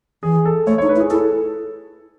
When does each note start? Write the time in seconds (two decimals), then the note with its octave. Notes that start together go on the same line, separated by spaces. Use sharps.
0.23 E3 G#4
0.45 A4
0.67 A3 C#5
0.78 D#4 C#5
0.89 B4
0.96 E4
1.00 G#4
1.10 E4 A4